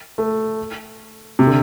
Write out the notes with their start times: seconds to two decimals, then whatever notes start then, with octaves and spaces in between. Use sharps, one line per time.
0.18 A3
1.39 C3
1.47 D3